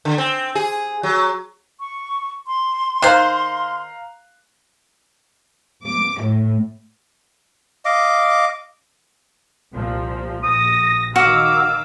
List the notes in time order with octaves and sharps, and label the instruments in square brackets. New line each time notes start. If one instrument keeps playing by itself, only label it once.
[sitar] D3
C4
G#4
F#3
[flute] C#6
C6
[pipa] D#3 C5 [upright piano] F5 A#5 F#6
[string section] D6
A2
[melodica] D#5 F5 D6
[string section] C2 A#2 F3
[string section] A#1 A#6 [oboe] D#6
[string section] D#3 D6 E6 [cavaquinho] F#4 [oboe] F5